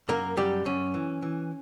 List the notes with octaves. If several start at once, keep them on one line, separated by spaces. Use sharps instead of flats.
F#2 A#3 A#4
F#2 G3 G4
F#2 C#4
E3
E3